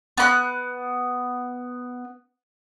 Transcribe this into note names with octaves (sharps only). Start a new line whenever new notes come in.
B3 B5 F#6